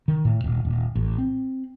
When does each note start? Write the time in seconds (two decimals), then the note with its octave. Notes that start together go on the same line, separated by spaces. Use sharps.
0.08 D#3
0.25 A2
0.44 D#1
0.65 D#1
0.95 A1
1.18 C4